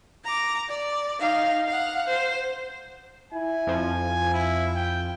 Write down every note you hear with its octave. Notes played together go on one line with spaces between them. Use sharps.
A#5 D6
D5
D#4 F5
F5 F#5
C5
E4 G#5
F2 F3
F4
E4
G5